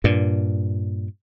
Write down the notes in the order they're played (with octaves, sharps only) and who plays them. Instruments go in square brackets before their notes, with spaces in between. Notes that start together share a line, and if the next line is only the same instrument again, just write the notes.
[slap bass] G2 A#2